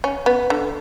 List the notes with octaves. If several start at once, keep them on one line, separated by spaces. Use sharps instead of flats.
C#4
B3
D3